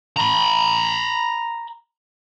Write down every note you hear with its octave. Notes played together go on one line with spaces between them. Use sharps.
A#5 B5